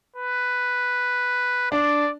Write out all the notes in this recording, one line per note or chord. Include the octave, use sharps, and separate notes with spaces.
B4
D4 D5